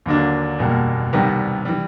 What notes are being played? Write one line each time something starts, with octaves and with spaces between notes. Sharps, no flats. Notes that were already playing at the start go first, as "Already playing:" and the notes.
D#2 D3 F#3 A#3 D4
F#1 E2 B2 G3 A#3
C2 C3 D#3 G3 B3
E3 G3